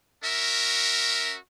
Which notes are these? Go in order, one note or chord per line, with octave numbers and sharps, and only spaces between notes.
C#4 F#4 A#4 E5